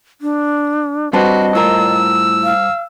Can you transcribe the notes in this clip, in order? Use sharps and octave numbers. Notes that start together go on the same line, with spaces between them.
D4
G3 C4 D4 F#4 B4 C5 D#5 A5
A2 F4 A#4 E6
F5